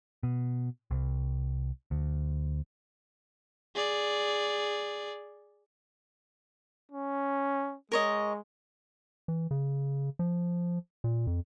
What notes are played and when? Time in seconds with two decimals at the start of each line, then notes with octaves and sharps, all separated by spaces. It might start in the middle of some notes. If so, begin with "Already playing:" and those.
0.23 B2
0.91 C2
1.91 D2
3.75 G#4 D5
6.92 C#4
7.92 G#3 A#4 C#5 D#5
9.28 E3
9.51 C#3
10.19 F3
11.04 A#2
11.27 F2